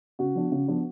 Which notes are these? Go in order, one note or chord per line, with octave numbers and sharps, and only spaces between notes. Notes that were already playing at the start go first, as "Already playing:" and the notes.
C#3 F#4
F3 B3 D4
C#3
F3 B3 D4